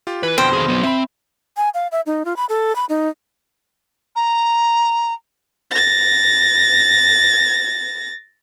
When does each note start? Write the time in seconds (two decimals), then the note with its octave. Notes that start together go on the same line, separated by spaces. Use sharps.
0.07 F4 G4
0.23 E3 B4
0.38 F2 B2 D3 C5 G5
0.53 D#3 G#4
0.68 F#3 B3
0.83 C4 E5 B5
1.57 G#5
1.74 F5
1.92 E5
2.06 D#4
2.25 F4
2.36 B5
2.49 A4
2.76 B5
2.89 D#4
4.16 A#5
5.71 A6 A#6